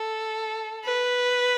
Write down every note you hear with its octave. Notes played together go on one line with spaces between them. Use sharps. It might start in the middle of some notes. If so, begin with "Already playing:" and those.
Already playing: A4
B4